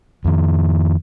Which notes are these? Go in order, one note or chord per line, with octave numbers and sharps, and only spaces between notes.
F2 D#3